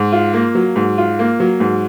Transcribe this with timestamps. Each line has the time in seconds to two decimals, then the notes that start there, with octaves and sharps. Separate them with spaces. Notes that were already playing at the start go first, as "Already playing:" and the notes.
Already playing: G#2
0.12 F4
0.33 A#3
0.55 F#3
0.76 G#2
0.98 F4
1.19 A#3
1.40 F#3
1.60 G#2